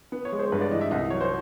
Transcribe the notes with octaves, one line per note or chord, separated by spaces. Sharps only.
B3
C#5
G#3
C5
G2 B4
D5
E3 D#5
E5
C2 D#5
F#3 C#5
C5